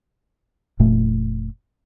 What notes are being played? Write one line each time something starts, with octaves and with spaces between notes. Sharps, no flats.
F1 A#2 A3